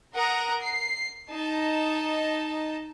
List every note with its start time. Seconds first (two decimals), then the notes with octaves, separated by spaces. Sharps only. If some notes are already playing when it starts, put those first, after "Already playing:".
0.14 A#4 F#5 A#5 D#6
0.60 C7
1.31 D#4 A5